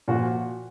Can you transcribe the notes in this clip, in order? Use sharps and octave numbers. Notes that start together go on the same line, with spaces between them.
A#2 F3 F#4